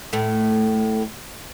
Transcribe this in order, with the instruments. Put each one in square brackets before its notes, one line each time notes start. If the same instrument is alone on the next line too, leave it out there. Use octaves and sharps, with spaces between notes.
[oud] A2 A3